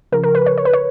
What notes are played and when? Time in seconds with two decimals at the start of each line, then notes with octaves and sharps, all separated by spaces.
0.12 C#3 F3 A#4
0.24 A#4
0.35 B4
0.46 C#5
0.58 C#5
0.65 B4
0.73 C#5